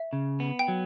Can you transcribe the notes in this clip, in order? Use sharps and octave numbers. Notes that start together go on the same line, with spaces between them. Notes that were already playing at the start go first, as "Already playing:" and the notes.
Already playing: E5
C#3
B3
G5
F#3